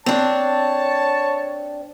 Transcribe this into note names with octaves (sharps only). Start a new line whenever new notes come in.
C4 D4 C#5 A5